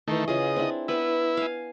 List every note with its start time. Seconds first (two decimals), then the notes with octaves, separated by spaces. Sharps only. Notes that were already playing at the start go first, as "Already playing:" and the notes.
0.08 D#3 E3 A3 C6 C#6
0.28 C#3 F4 G#4 D#5
0.56 C4 D4 E4
0.88 B3 E4 B4 G5
1.37 F5 G#5